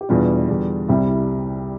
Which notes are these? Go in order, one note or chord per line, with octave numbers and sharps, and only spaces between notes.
G4
E2 B2 G3 D4 F4
E2 D3 G3
C2 C3 G3 E4 G4